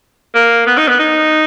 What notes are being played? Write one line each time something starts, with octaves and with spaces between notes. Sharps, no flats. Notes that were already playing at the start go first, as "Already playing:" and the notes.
A#3
B3
D#4
B3
D#4